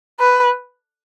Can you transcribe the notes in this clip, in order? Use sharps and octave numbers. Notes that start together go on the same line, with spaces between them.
B4